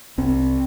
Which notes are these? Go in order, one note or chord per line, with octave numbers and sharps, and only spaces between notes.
C2 C4